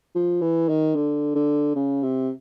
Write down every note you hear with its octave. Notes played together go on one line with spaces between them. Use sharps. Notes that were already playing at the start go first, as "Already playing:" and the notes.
F3
E3
D#3
D3
D3
C#3
C3